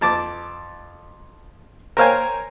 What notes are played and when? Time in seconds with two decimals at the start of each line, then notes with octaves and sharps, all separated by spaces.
0.01 F2 A5 D6
1.97 A#4 C5 C#5 F5 G5 G#5